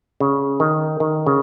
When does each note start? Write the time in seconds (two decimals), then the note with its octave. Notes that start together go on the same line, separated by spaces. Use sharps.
0.20 C#3
0.60 D#3
1.00 D#3
1.26 C#3